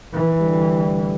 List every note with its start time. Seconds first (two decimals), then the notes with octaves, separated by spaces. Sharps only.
0.13 E3
0.40 D2 D3 G3